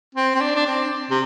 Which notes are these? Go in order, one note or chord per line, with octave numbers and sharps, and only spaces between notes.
C4
C4
D4
D4
C4
C3